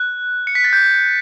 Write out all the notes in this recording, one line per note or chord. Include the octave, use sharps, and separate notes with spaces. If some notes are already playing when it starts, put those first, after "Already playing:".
Already playing: F#6
C#7
B6
A6
G6